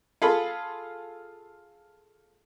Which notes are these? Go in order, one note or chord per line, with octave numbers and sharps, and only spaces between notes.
F4 G#4 A4 B5 C6